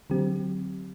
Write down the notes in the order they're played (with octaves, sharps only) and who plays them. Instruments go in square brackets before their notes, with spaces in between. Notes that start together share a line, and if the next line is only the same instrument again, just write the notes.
[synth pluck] D3 F#3 C4 G4